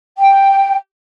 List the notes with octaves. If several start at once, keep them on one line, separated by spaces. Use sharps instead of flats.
G5